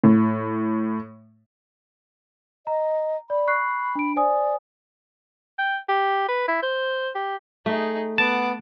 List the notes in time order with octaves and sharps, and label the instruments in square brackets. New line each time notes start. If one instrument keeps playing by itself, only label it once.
[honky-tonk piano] A2
[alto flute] D#5 [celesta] A#5
[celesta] D5 [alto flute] B5
[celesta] C#6 F#6 C7
D4 D7
[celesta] C5 G#5 D#6 [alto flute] D5
[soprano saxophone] G5
G4
B4
E4
C5
G4
[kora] A3 [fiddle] D#4 G#4
[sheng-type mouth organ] B3 [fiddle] F#5 D6 [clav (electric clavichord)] A5